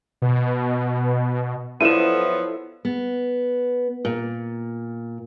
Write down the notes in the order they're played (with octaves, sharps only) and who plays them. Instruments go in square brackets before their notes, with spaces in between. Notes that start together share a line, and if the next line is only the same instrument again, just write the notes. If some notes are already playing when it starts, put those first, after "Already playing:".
[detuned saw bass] B2
[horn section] F3 F#3 B3 [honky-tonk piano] E4 A4 D5 [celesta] D#7 E7
[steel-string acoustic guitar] B3
A#2